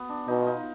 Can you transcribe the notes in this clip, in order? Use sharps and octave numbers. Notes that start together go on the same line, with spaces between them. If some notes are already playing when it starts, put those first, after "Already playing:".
Already playing: B3
D4
B2 D#4
D#4 F4